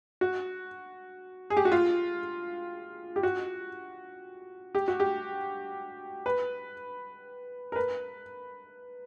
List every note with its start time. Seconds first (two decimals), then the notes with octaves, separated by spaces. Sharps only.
0.21 F#4
1.50 G#4
1.57 G4
1.65 F#4
1.72 F4
3.16 G4
3.23 F#4
4.75 G4
4.88 F#4
5.00 G4
6.26 B4
7.72 A#4
7.76 B4